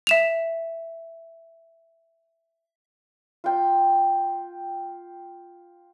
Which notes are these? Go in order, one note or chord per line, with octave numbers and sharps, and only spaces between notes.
E5 E7 F7
F4 G5